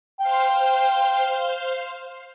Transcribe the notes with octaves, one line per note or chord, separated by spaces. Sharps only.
C5 F5 G5 C6